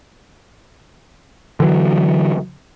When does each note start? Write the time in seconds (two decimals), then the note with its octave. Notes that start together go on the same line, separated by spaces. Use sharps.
1.60 D3 E3 F#3